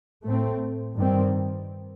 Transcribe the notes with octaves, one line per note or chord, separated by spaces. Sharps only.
A2 A3 C4
G2 D#3 G3 C4